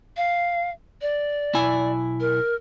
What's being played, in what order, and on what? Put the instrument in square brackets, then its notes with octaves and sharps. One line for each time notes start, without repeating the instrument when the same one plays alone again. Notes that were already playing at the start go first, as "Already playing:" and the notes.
[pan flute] F5
D5
[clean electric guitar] B1 E4 G#5
[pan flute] A#4